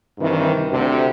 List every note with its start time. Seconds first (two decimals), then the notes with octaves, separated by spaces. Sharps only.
0.19 G2 C3 D#3 E3
0.70 D2 C3